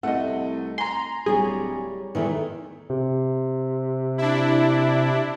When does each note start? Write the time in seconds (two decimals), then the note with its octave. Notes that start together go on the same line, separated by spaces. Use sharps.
0.03 C2 A3 D#5 F#5
0.78 G#5 A#5 C6
1.26 D1 G3 G#4 C#5 D5
2.15 E2 D#3 E3 A3
2.90 C3
4.18 D4 E4